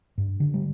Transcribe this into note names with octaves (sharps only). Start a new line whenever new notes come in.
G2
D3
G3